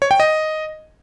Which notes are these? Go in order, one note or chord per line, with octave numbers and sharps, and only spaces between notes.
C#5
G5
D#5